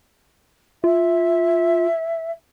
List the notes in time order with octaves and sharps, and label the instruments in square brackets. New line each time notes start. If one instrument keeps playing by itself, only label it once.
[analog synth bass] F4 [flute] E5